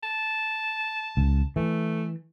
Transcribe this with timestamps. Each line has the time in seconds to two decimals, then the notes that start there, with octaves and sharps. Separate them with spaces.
0.03 A5
1.17 C#2
1.56 E3 A3